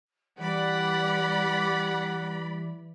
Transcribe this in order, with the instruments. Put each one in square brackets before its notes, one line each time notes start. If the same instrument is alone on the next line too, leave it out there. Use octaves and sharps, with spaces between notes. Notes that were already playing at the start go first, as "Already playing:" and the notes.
[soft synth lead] E3 [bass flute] G3 [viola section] D5 B5 [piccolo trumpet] F#5